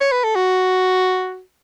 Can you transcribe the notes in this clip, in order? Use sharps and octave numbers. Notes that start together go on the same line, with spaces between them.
C#5
B4
A4
F#4